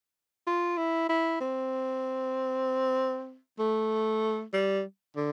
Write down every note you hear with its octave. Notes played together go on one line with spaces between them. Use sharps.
F4
E4
E4
C4
A3
G3
D3